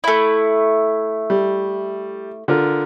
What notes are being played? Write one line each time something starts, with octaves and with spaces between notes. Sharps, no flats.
A3 E4
G3
D3 F4 A#4